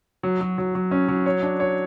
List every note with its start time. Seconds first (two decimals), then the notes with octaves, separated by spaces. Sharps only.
0.23 F#3
0.41 F#3
0.58 F#3
0.75 F#3
0.91 C#4
1.08 F#3
1.26 C#5
1.43 D4
1.60 C#5